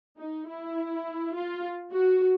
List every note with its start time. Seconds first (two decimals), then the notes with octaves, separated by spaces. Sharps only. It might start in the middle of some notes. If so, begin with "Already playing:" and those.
0.19 D#4
0.49 E4
1.34 F4
1.93 F#4